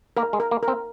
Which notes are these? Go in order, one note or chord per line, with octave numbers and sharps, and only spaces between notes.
A#3 A#4
G#3
A#4
A#3
A#4
C4